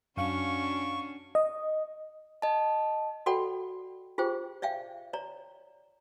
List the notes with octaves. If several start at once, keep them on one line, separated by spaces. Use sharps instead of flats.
F#2 C#4 D4 F#4 F5 C#6
D#5
D#5 A5
F#4 A4 D5 F#5 G5 B5
F4 G4 G#4 C5 G5
D5 E5 F5 G5
C#5 D5 A#5